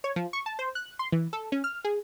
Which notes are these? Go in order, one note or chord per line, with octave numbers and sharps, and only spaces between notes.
C#5
F3
C#6
A5
C5
F#6
C6
E3
A4
C#4
F6
G#4